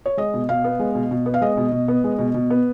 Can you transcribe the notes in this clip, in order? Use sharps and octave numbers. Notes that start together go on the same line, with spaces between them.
C#5
G#3 D#5
B2
B2 F5
B3
G#3
B2
B2
B3
F5
G#3 D#5
B2
B2
B3
G#3
B2
B2
B3